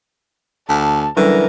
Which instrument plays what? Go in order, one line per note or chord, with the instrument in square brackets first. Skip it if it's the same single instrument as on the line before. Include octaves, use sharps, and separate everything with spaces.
[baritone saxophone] D2 [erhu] A5
[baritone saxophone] D3 [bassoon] E3 [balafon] F#3 G3 C#4 [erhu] A#4